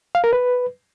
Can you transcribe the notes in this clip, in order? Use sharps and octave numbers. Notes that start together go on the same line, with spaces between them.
F5
A#4
B4